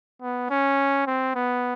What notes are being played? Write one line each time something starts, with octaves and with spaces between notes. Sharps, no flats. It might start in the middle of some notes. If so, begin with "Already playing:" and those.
B3
C#4
C4
B3